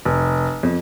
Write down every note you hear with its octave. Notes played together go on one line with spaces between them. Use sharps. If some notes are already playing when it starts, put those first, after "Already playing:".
F1
F2